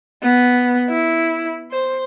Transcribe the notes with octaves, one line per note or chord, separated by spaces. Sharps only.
B3
E4
C5